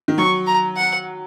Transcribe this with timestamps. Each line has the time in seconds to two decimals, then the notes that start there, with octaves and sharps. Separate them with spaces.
0.08 D#3
0.18 F#3 C#6
0.47 A#5
0.77 F#5